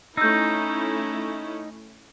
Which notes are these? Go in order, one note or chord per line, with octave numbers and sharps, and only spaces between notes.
A3 C#4 D#4 E4 E6 G6